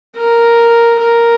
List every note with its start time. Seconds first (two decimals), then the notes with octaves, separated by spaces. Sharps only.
0.16 A#4
0.99 A#4